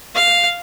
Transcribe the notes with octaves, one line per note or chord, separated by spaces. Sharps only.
F5